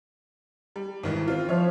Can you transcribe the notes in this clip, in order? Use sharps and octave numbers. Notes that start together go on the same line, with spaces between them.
G3
G#1 D#3 E3
C4 F4
F3 C#5 E5 F6